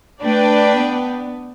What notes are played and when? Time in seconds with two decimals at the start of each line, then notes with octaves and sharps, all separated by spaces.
0.22 A3 D4 B4 D5 G5
0.76 B3